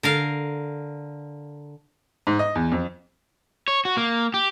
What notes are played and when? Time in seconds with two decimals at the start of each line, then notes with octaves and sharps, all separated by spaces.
0.03 D3 A#4 F5
2.27 G#2
2.39 D#5
2.55 E2
2.72 F2
3.68 C#5
3.85 F#4
3.97 A#3
4.34 G4